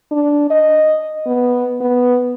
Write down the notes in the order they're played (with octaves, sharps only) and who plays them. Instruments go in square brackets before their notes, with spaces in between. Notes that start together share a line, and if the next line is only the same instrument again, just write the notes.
[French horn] D4
D#5
B3
B3